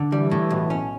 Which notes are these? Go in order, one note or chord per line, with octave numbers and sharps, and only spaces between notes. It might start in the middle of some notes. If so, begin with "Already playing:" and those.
Already playing: D3
E3 G3
A2
B1
C#4